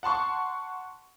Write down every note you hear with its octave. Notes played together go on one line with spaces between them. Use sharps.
F#5 A5 C6 C#6